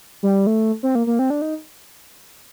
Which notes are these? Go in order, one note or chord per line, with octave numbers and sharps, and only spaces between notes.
G3
A3
C4
A#3
A#3
C4
D4
D#4